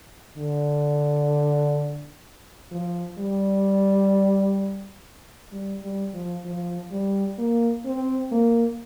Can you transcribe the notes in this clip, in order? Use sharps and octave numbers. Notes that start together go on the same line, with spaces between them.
D3
F3
G3
G3
G3
F3
F3
G3
A#3
C4
A#3